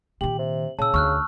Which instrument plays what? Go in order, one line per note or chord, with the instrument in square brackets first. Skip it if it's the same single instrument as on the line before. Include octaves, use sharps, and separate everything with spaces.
[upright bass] A#2 D#3 [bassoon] G4 [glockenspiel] F#7
[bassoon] C3
[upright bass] A#2 [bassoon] C#3 [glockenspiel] A5 E6
[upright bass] D2 [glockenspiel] C#6 F6 F#6